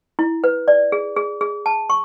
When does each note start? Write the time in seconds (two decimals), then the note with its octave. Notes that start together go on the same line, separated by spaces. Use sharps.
0.19 E4
0.44 B4
0.68 D5
0.92 G#4
1.16 G#4
1.41 G#4
1.66 A5
1.90 C#6